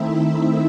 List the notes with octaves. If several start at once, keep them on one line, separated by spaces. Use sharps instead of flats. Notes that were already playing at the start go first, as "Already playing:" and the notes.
Already playing: D#3 A3 C4 D#4 E4 E5